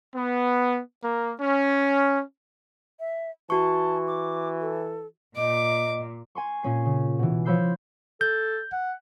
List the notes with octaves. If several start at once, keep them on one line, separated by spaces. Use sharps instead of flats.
B3
A#3
C#4
E5
E3 F#4 A5 C#6
D6
A4
A#2 D#5 D6
G#5 C6 C#6
A#2 C#4 C7
C#3
B2 E3
F3 C#5 B5 E6 G6 C7
A4 G6
F#5